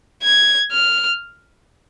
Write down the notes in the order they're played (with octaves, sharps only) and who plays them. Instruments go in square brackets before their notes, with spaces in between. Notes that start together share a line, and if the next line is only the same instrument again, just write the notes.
[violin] G#6
F6